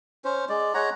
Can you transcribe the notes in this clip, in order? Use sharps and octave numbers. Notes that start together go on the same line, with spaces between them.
C#4 C5
G#3 D5
G#3 C#5 F#5 A#5